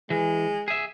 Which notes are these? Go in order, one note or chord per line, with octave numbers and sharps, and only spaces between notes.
E3 G#3
G#4 E5